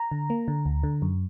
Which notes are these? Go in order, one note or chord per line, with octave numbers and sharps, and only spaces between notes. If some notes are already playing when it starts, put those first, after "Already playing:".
Already playing: A#5
D3
A#3
D3
D2
D3
F#2